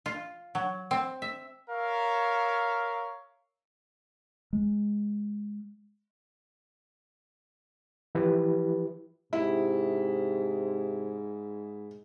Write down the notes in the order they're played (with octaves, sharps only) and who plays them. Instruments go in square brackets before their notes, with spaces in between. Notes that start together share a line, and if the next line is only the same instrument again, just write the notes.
[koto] F4
F#3
C4
E5
[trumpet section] A#4 C#5 E5 F5
[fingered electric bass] G#3
[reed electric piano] E3 F3 E4 G4 B4
[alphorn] G#2 [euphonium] C3 [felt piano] E4